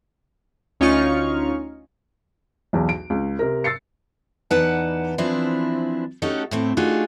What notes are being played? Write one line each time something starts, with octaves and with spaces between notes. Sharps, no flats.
D2 C#4 D#4 F4 C#6 F6
B1 E2
D7
C#2
C3 A#4
E6 A6 C7 C#7
E2 D#4 B4 D5 F#5 A5
E3 F3 C4 D4 E4
A3 C#4 D#4 F#4 G4 A4
A2 A3 C4
A3 D4 D#4 F4 F#4 G#4